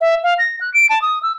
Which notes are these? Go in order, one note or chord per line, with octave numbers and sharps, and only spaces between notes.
E5
F5
A#6
F#6
D7
A5
D#6
E6